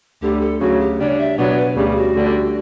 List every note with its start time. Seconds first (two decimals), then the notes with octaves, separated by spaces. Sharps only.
0.22 D2 D3 G3 G4
0.41 A4
0.60 D2 C#3 F#3 F#4
0.80 G4
0.99 C#3 G3 D4 C#5
1.19 E5
1.37 B2 F#3 B3 D4 C#5
1.57 B4
1.76 D2 C#3 G3 G4
1.96 F#4
2.16 D2 D3 G3 D4